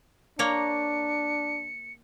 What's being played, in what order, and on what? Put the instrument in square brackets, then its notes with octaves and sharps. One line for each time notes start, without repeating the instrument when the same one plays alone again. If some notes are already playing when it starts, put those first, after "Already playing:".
[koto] A#3 C#5 A#5 [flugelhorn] D4 [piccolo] C#7